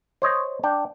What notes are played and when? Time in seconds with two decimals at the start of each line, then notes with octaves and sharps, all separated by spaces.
0.22 C5 C#5 D#5
0.63 D4 G5